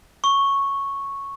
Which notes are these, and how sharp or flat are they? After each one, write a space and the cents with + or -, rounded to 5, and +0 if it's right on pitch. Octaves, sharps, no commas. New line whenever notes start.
C#6 -5